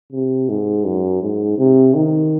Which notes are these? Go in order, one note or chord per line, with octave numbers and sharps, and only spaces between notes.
C3
G#2
F#2
G#2
C3
D#3